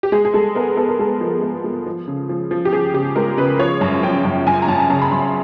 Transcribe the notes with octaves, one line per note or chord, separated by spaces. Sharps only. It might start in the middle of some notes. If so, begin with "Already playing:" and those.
G4
G#3 G#4
G#4
G#3 A4
B3 A#4
B3 A4
A#4
G#3 A4
F3
G#3
G#3
F3
C#3
F3
F3
G4
F3 G#4
C#3 G4
G#3 A#4
C#3 B4
F3 C#5
F#2
F3 G5
F#2
F#2 G#5
A#5
F#2 A5
C#3 A#5
B5
F#2 C6